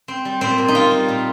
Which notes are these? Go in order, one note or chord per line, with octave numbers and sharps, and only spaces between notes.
C4
G3
A#2 C4
A#2
D#4
C4 F4
G3
A#2